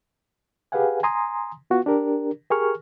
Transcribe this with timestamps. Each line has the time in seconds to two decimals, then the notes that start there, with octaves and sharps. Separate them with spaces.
0.72 G4 G#4 B4 F5 F#5 G#5
1.03 G#5 A#5 C6 D#6
1.70 B3 F4 F#4
1.86 D4 G4 A#4
2.50 G4 G#4 A#4 G#5 C#6 F6